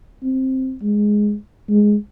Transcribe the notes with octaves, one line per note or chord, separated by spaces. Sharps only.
C4
G#3
G#3